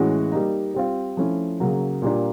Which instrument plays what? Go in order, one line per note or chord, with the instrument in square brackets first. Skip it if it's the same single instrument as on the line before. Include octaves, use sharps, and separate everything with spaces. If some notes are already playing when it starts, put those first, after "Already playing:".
Already playing: [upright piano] A2 E3 G#3 C#4 F#4
G3 A#3 D#4
G3 C4 F4
F3 A3 C#4 E4
C#3 F#3 A#3
A#2 G3 A#3 D4